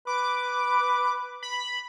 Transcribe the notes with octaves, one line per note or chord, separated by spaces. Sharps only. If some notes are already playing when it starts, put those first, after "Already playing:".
B4 D6
B5